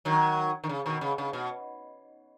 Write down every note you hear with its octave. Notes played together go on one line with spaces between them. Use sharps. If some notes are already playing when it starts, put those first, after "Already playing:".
D#3 F#3
D#3
C#3
B2 D#3
C#3
C#3
B2